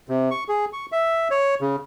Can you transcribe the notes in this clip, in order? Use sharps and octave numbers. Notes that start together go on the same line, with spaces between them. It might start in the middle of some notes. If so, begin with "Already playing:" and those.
C3
C#6
G#4
C#6
E5
C#5
C#3